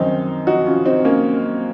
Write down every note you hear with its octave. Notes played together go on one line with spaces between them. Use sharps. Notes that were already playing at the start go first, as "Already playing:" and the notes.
Already playing: F#2 D#3 C4 D#4
D#4 F#4
C#4 F4
C4 D#4
A#3 C#4